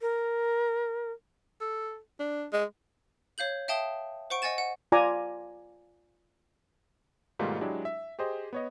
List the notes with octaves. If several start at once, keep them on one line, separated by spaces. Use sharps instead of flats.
A#4
A4
D4
G#3
C#5 F5 G6 F#7
E5 F5 G5 A5 D#6 G7
C5 F#5 C#6 D7
D#5 F#5 G#5 A6 E7
F#5
F4 D5 G#5 A#5 D6
G#2 B2 D#3 G3 A3 F4
F#3 G#3 D4 E4 G4
E5
G4 G#4 C5 D#5
B3 C#5 D#5